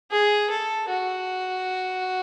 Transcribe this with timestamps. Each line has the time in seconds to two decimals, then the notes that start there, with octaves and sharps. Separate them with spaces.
0.11 G#4
0.50 A4
0.89 F#4